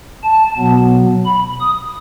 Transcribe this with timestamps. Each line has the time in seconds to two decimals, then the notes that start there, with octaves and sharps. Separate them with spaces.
0.24 A5
0.58 B2 F#3 B3
1.25 B5
1.60 D#6